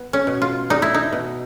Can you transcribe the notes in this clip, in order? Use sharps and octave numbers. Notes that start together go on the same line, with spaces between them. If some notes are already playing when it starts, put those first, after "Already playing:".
Already playing: B3
C#4
B2
F4
G3 D#4
E4
D#4
B2